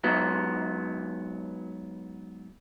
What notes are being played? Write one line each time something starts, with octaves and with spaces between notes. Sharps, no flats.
G#2 F#3 B3